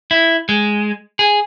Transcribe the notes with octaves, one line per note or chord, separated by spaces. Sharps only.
E4
G#3
G#4